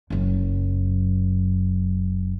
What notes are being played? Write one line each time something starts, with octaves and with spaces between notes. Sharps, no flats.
F#1 F#2